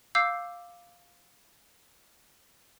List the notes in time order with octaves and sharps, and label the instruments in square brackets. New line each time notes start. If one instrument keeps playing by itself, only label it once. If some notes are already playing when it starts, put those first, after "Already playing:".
[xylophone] F5 D6 E6 G6 C7